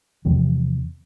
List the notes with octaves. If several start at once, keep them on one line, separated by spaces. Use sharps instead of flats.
E2 C3 F3